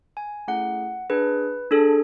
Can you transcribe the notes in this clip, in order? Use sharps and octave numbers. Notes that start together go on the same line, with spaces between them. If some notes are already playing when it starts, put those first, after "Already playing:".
G#5
A3 C#4 E4 G#4 F#5
D4 G#4 B4
D4 G#4 A4